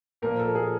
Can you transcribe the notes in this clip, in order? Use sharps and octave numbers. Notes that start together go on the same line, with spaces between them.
A#2 F3 A#3 A#4
A4
G#4